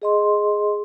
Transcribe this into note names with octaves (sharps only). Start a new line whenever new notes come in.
G#4 D#5 C6